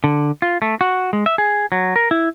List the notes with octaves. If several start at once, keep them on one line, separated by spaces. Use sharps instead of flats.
D3
F4
A3
F#4
G#3
E5
G#4
F#3
A#4
E4